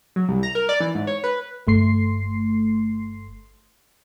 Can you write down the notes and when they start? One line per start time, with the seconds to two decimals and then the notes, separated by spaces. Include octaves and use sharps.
0.16 F#3
0.28 C2
0.43 A#5
0.55 A#4
0.69 D5
0.80 E3
0.95 G#2
1.07 C#5
1.24 B4
1.67 G1 A3 C6 C7